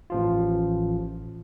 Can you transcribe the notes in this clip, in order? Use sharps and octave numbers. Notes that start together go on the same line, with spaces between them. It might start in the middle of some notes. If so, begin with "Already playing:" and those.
A1 F3 F4